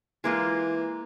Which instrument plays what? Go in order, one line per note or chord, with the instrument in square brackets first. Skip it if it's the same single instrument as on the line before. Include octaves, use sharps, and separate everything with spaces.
[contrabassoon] E3 [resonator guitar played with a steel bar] G#3 A#3 F4